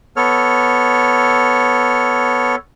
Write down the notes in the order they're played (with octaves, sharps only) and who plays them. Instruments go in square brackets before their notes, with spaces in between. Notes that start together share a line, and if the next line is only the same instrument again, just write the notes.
[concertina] B3 A4 C#5 F6